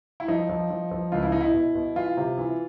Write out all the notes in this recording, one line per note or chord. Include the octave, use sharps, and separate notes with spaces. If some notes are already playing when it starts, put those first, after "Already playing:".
E4
F3 D#4
F3
F3
F3
C#2 F4
E4
B2 D#4
E4
B2
B2
E3 F4
C3
E3